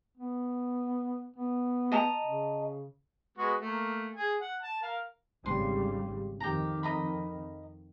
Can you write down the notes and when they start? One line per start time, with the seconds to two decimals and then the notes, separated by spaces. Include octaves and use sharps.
0.18 B3
1.37 B3
1.92 D#5 A5 A#5
2.20 C#3
3.38 G#3 B3 F#4
3.61 A3 A#3
4.15 G#4 G#5
4.41 F#5
4.63 A5
4.83 A#4 F5
5.46 G#1 C#3 G3 C6
6.40 F2 D#3 G4 A#5
6.83 D#5 A#5 B5